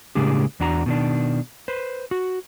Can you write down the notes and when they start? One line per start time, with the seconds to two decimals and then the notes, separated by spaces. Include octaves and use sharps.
0.15 A2 C#3 G#3 A#3 D4 G4
0.60 E2 D4 F#4 A#5
0.86 B2 D#3 D4
1.68 B4 C5
2.11 F#4